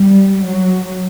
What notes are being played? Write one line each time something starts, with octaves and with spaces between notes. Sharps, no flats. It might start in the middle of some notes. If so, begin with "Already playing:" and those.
Already playing: G3
F#3